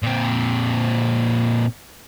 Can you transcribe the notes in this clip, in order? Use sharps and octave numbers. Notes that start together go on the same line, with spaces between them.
A#2 C4